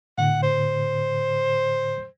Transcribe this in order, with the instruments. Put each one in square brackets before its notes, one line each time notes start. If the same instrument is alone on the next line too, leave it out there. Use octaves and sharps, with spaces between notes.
[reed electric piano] A2 D3 [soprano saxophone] F#5
[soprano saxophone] C5